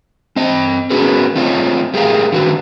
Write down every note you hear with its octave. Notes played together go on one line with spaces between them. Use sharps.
C4 D#5
B3 C#4 F#4 G#4 A#4 B4
A3 C4 F4 C#5 D#5
A3 G4 G#4 A#4 F5
D3 D#3 F#4 B4